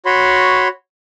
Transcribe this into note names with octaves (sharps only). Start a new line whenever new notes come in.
F#4 C#5 B5 C6